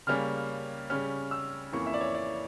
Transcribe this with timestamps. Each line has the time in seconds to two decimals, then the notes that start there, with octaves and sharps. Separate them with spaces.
0.07 C#3 G3 A#3 C#4 F6
0.90 C#3 G3 C#4 F6
1.31 E6
1.72 F2 E3 A#3 C#4 C#6
1.86 E5
1.94 D5
2.01 C#5
2.15 D5